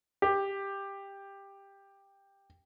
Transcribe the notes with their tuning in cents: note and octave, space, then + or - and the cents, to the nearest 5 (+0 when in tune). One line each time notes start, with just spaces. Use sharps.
G4 +10